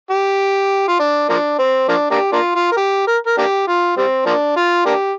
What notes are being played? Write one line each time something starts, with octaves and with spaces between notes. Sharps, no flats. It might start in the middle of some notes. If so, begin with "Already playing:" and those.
G4
F4
D4
F3 A#3 D4
C4
F3 A#3 D4
A#3 D4 G4
A#3 D4 F4
F4
A#4
G4
A#4
A#4
A#3 D4 G4
F4
G3 C4
F3 A#3 D4
F4
A#3 D4 G4